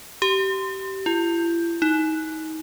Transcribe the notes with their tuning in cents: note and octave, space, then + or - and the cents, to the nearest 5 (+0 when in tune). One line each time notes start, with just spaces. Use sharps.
G4 -25
E4 +40
D#4 +25